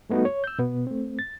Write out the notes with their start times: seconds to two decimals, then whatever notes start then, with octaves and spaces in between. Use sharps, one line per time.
0.10 G3 A3 B3 D#4 F#4
0.25 C#5
0.44 E6 G6
0.59 B2 B3
0.87 A3 C4
1.19 A6